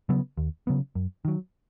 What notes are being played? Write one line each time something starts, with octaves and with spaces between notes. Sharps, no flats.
C#3 F#3 B3
D#2
C#3 F#3 B3
F#2
D#3 F#3